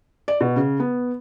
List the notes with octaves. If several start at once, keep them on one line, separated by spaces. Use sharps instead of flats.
D5
B2
C#3
B3